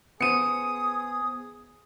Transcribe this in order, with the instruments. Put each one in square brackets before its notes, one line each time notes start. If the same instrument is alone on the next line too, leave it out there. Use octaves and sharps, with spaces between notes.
[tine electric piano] B3 C5 [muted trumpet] G#4 [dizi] D#6 [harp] C#7 D#7